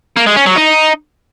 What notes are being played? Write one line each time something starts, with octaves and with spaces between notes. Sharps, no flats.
A#3
G#3
C#4
F#3
D#4